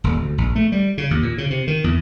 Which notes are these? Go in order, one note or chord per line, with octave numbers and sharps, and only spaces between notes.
D#1
D2
A#1
A3
G3
C#3
D#2
A#2
C#3
C3
D#3
E2